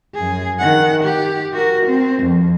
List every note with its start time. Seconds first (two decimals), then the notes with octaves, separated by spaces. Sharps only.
0.15 F#2 G#4
0.59 D#3 F#5
1.03 G4
1.54 F#4 A#4
1.86 C4
2.23 F2